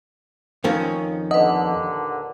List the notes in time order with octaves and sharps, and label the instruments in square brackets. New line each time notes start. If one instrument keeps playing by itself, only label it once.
[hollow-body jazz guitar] F2 D#3 C#4
[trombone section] D#2 A#2 D3 [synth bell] B4 F#5 [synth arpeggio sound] D#5